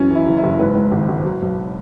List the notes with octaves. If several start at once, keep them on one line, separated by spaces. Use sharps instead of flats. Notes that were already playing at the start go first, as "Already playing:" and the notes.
Already playing: F#2 E3 C#4
E3 E4
F#1
E4
F#1
G#2 B4
G#2
G#1
G#1
F#3
B1